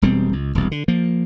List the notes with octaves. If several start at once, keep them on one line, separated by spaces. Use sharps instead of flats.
E1 B2 G3 C4
C#2
E1 C2
D3
F3 A#3